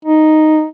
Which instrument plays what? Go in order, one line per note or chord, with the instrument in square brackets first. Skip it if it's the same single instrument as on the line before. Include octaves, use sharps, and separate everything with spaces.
[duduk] D#4